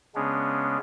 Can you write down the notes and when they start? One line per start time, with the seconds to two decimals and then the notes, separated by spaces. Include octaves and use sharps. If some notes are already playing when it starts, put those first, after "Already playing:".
0.15 C#3 G#3 B3 C#4 D4